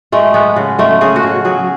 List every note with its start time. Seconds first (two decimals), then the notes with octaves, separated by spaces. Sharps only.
0.12 G#3 A3
0.34 G#3 B3
0.56 C#3
0.78 G#3 A3
1.01 C#3 G#4
1.16 F#4
1.23 C#3
1.45 F#3 G#4